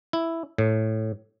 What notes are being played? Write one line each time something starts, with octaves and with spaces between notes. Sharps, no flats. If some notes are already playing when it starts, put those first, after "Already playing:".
E4
A2